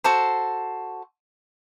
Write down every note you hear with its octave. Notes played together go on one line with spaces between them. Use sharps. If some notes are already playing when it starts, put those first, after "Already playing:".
F#4 A4 C5